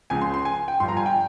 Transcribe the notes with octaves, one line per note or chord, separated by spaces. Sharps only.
C#2 C#3 F3 G#5
C6
C6
G#5
G5
G1 G2 F3 C6
A#5
G#5
G5